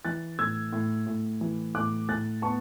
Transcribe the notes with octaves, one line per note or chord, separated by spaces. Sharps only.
E3 F#6 A6
A2 E6 G#6
A2
A2
E3
A2 D6 F#6
A2 F#6 A6
B3 A5 C#6